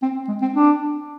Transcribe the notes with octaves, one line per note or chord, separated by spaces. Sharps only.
C4
G#3
C4
D4